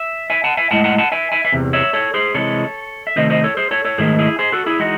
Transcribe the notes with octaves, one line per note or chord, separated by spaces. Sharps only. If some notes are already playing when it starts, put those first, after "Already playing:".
Already playing: E5
E5 G#5
F#5 A5
E5 G#5
A2 G#3 F#5 A5
F#5 A5
F#5 A5
E5 G#5
E5 G#5
E5
E2 C3
C#5 E5
A4 C#5
G#4 C5
C3 E3 G#3 A4 C#5
E5
C3 D#3 A3 C5 D#5
C5 D#5
A4 C#5
G#4 C5
A4 C#5
A4 C#5
G#2 D#3 A3 G#4 C5
E4 G#4
G#4 C5
F#4 A4
E4 G#4
E3 G#3 D#4 F#4